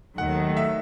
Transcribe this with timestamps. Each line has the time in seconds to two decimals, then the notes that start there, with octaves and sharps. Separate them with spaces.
0.18 D#2 D#3 F#3 A3 F#5
0.57 E5